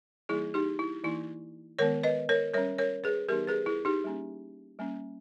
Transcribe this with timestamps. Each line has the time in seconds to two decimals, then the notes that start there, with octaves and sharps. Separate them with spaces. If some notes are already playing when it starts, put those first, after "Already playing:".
0.29 E3 G3 A#3 D#4 E4 G#4
0.54 D#4 G4
0.79 E4
1.03 E3 A#3 D#4 E4
1.79 D#3 G#3 B3 A#4 C#5
2.03 B4 D#5
2.29 A#4 C#5
2.54 G3 C#4 A#4 C#5
2.79 A#4 C#5
3.04 G#4 B4
3.29 E3 G3 B3 D#4 G4 A#4
3.47 G#4 B4
3.66 E4 G#4
3.85 D#4 G4
4.04 G3 A#3 C#4
4.79 G3 A#3 C#4